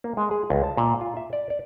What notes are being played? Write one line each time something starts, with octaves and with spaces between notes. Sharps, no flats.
A#3
G#3
G#4
C#2
A5
A#2
F4
E5
D5
D5